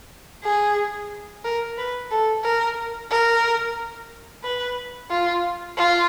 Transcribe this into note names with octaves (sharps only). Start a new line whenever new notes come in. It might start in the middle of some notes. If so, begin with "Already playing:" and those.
G#4
A#4
B4
A4
A#4
A#4
B4
F4
F4